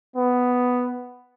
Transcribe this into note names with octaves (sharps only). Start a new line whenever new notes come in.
B3